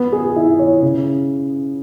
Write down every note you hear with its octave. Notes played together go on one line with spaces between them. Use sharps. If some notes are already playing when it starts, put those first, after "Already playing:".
Already playing: B3
G#4
E4
C#5
C#3